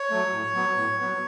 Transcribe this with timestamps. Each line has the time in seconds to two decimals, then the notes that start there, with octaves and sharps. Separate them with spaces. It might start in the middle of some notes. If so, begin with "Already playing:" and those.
Already playing: C#5
0.11 F#3 A3
0.33 A2
0.55 F#3 B3
0.77 A2
0.99 F#3 B3